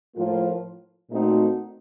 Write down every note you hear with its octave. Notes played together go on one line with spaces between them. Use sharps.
A2 F3 A#3 F4
A#2 A3 C4 D#4 F#4